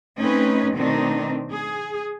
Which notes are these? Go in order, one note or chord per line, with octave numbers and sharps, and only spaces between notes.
A3 C4 C#4 D#4 B4
B2 D#3 A3 C4 D4 D#4
G#4